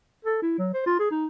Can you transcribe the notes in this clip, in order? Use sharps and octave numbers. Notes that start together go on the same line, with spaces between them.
A4
E4
F#3
C5
F4
G#4
D#4